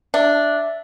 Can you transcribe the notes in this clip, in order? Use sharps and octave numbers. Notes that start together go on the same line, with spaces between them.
D4 E5